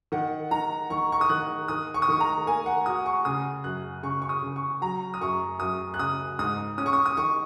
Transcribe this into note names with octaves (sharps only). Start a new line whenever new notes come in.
D#3 F#5
D#3 A#5
D#3 C#6
C#6
D#6
D#3 F#6
D#3 D#6
C#6
D#6
D#3 C#6
A#5
A#3 G#5
F#5
F#4 D#6
C#6
C#3 D#6
F#2 F#6
C#3 C#6
C#6
D#6
C#3
C#6
F#3 A#5
D#6
F#2 C#6
F#2 D#6
F#6
C#3 D#6
G#2 D#6
C#4 D#6
C#6
D#6
D#6
D#3 C#6